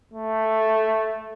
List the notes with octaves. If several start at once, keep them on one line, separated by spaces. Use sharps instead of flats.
A3